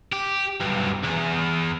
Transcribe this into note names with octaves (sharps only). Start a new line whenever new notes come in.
G4
B1 G2
E2